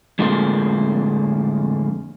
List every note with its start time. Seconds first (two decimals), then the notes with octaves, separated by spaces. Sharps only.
0.19 F2 A2 D3 G#3 A#3 F4